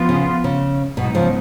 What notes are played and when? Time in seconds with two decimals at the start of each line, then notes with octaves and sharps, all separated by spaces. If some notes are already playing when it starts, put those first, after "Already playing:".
Already playing: F3 B3 F4
0.09 C#3
0.44 C#3
0.97 G#2 B2 F#3 B3 D#4
1.15 C#3 F3